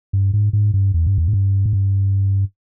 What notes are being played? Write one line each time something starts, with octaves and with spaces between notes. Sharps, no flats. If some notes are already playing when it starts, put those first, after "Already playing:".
G2
G#2
G#2
G2
E2
G2
E2
G#2
G2
G#2
G2